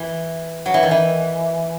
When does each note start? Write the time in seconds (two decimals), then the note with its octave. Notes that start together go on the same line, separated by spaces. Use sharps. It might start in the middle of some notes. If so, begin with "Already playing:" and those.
Already playing: E3
0.66 F#3
0.74 E3
0.83 D#3
0.91 E3